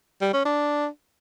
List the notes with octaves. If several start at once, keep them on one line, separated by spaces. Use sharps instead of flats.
G3
C#4
D4